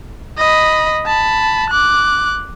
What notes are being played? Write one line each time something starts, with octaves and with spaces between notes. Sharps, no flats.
D#5 B5
A5 B5
D6 F#6